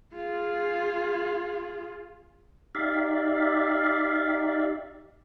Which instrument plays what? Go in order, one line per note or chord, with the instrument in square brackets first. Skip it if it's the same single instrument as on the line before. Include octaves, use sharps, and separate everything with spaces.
[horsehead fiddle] F4 G#4
[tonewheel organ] D#4 G4 D5 E5 F5